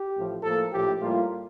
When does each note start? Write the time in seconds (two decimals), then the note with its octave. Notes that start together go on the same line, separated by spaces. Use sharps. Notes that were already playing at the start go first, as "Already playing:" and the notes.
Already playing: G4
0.15 A1 A2 F3
0.44 A2 F3 A#3 A4
0.72 A#1 A2 F3 G4
1.01 A2 G3 A#3 F4